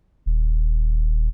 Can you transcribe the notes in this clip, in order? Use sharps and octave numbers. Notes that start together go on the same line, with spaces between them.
D#1